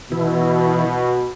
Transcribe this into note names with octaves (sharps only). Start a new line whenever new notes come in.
B2 E3 E4